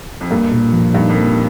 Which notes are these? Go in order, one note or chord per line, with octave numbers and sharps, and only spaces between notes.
F2
G2 A#3
A#2
F3
G2 D#4
F2
A#3